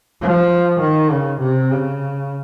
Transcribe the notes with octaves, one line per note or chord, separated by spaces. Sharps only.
F3
D#3
C#3
C3
C#3